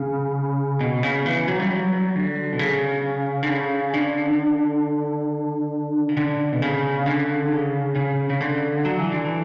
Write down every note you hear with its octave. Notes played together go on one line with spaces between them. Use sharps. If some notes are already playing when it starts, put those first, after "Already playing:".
Already playing: C#3
B2
C#3
E3
F#3
G3
F#3
D3
B2
C#3
D3
C#3
D3
C#3
D3
B2
C#3
D3
C#3
C#3
C#3
D3
F#3
E3
D3
E3